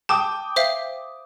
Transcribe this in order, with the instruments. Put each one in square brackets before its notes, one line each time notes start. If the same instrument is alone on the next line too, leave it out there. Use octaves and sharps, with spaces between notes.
[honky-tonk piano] G5 D6 D#6 [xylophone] A5
[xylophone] C5 E5 F5